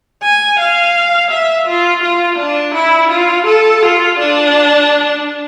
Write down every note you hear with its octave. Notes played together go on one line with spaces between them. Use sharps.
G#5
F5
E5
F4
F4
D4
E4
F4
A4
F4
D4